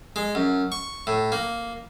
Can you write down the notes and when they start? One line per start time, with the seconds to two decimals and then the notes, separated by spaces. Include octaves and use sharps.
0.16 G#3
0.35 F#2
0.72 C#6
1.07 A2
1.32 A#3